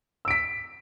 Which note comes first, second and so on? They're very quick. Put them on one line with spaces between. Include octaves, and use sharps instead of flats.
E6 D7 B6